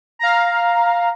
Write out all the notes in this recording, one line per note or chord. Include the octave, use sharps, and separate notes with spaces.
F5 A#5